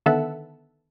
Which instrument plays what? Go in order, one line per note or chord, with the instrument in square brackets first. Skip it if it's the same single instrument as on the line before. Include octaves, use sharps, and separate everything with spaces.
[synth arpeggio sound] D3 D#3 B3 A4 E5 F#5